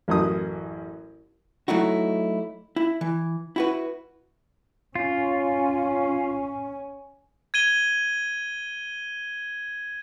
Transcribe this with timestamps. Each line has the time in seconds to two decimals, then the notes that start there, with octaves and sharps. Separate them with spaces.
0.08 A1 F#2 D#6
1.68 F#3 A3 D#4 E4 F#4
2.76 E4
3.01 E3
3.56 E4 F#4 B4
4.95 C#4 F4
7.54 G#6 D#7 G7